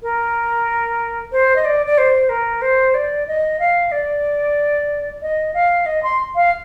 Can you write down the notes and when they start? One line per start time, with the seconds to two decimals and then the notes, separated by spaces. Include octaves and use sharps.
0.02 A#4
1.32 C5
1.56 D#5
1.65 D5
1.86 D5
1.98 C5
2.29 A#4
2.62 C5
2.94 D5
3.27 D#5
3.59 F5
3.92 D5
5.22 D#5
5.54 F5
5.86 D#5
6.03 C6
6.35 F5